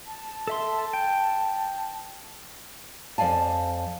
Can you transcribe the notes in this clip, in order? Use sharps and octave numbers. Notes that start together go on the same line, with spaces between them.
A5
A4 E5 C6
G5
F2 D5 F5 G#5 A5